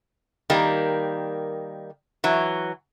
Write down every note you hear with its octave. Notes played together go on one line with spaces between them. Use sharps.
D#3 G3 A#3
E3 F#3